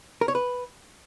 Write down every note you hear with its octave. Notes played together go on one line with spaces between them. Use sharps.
A#4
C#5
B4